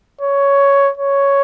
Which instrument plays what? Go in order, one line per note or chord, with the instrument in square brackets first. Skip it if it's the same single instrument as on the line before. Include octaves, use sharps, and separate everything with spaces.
[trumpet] C#5
C#5